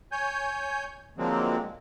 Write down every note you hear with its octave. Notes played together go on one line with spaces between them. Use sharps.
C#5 G#5 G6
D3 F3 F#3 G#3 A#3 C4